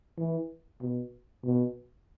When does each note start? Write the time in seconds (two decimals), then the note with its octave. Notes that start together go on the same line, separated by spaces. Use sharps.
0.18 E3
0.81 B2
1.44 B2